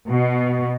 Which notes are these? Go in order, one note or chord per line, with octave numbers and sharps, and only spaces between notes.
B2